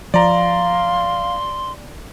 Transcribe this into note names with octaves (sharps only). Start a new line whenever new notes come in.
F3 D5 F5 A#5 C6